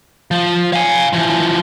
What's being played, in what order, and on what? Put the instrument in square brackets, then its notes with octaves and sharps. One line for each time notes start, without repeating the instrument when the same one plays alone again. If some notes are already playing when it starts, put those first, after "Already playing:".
[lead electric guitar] F3
F5 G#5
E3 F3